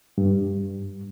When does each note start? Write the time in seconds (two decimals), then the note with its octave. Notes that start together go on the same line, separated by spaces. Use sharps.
0.18 G2